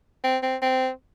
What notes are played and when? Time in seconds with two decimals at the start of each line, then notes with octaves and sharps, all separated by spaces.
0.24 C4
0.43 C4
0.62 C4